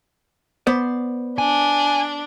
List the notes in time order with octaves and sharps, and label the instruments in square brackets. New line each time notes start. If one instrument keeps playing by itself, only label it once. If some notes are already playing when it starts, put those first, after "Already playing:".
[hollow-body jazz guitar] B3 C5 D5
[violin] D4 [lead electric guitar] G#5